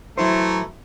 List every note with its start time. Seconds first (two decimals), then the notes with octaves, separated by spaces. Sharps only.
0.18 E3 F#3 A3 E4 C5 A#5